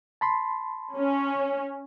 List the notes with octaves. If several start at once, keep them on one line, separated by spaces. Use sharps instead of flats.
A5 B5 C6
C#4